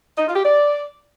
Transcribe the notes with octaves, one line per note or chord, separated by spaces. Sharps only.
D#4
F4
G4
D5